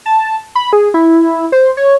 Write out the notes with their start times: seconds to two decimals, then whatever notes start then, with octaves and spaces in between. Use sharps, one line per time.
0.06 A5
0.55 B5
0.73 G#4
0.94 E4
1.52 C5
1.77 C#5